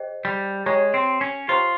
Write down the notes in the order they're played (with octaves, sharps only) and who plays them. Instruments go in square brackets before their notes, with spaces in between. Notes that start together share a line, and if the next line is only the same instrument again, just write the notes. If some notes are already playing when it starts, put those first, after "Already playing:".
Already playing: [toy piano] G#4 C5 D#5 G5
[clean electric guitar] G3
[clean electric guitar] G#3 [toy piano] G4 C#5 G5 A#5 C#6
[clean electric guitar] C4
C#4
[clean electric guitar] F4 [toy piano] G4 C5 G5 A#5 C#6